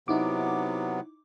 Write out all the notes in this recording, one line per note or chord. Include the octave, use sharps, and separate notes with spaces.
C3 F#3 B3 D#4 E4 D6